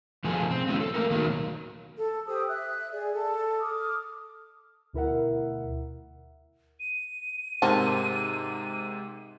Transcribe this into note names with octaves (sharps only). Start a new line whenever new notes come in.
B2 F3 G#4 A4
C4
G#3 B3 C#4 D#4 E4 F#4
A4
A3 A#3 F#4 A#4
B2 D#3 F#3 A#3
A4
G4 C5 D#6 E6
E5 F#6
G#4 D5
A4
D6 D#6 F6
D2 B2 E4 A#4 E5 F#5
D#7
G#2 C3 C4 A#4 A5